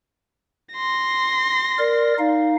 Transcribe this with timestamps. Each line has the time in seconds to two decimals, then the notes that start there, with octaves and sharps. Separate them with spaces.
0.74 C6 A#6
1.79 A#4 D5
2.19 D#4 F5